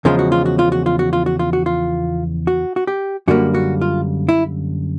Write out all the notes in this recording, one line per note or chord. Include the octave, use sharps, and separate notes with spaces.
E2 C#3 F3 G#3 F4
F#4
F4
F#4
F4
F#4
F4
F#4
F4
F#4
F4
F#4
F4
F#4
F#4
G4
F#2 D3 G3 A#3 F#4
F#4
F4
E4